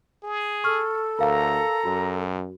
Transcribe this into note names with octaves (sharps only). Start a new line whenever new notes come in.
G#4
A4 C#6 F6
D2 A#4 F5 A#5
F#2 F#4